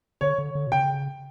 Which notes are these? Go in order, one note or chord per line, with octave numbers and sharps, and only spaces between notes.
D3 C#5
D3
D3
B2
C#3 G5